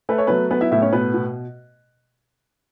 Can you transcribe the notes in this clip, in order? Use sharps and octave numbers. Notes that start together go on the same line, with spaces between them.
A3 B4
C#5
F#3 B3 B4
B3 B4
E4 E5
A2 E4 E5
C#4 C#5
B2 B3 B4
B2